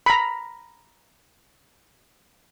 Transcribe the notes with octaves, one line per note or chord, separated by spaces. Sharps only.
A#5 B5